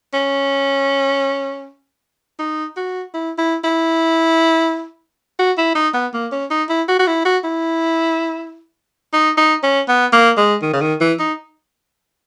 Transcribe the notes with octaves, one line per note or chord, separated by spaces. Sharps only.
C#4
D#4
F#4
E4
E4
E4
F#4
E4
D#4
B3
A#3
C#4
D#4
E4
F#4
F#4
E4
F#4
E4
D#4
D#4
C#4
B3
A#3
G#3
D#3
C#3
D#3
E3
D#4